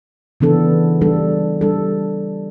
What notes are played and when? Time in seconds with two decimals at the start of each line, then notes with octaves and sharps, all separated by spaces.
0.41 C#3 E3 B3 D4 A4
1.01 G3 D4 A4
1.61 G3 D4 A4